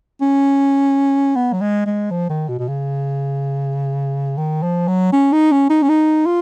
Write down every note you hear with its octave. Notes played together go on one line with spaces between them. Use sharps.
C#4
B3
F#3
G#3
G#3
F3
D#3
B2
B2
C#3
D#3
F3
F#3
C#4
D#4
C#4
D#4
C#4
D#4
F4